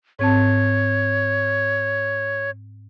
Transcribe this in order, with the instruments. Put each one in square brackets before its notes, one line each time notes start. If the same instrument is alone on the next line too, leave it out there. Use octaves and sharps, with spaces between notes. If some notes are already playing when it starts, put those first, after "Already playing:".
[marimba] G#2 C4 A5 [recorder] C#5